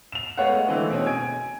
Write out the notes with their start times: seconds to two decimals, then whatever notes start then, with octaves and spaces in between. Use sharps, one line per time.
0.12 E7 F7
0.37 G#3 A3 B3 C#5 F5 F#5
0.68 D3 E3 G#3 A3 C4 D#4
0.91 B2 C4 C#4
1.06 G#5 G#6 D7